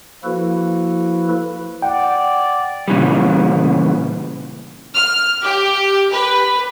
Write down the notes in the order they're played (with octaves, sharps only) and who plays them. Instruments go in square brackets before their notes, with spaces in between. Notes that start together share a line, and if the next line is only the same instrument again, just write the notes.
[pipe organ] F3 A#3 E4 F#4 A4 B4
[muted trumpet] D5 [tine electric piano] F#5 G5
[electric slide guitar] A#2 C#3 E3 G3
[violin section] F6
G4
B4